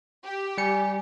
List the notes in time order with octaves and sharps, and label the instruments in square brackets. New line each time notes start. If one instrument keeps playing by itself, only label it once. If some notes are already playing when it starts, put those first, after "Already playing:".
[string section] G4
[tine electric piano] G3 C#7 [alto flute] G#5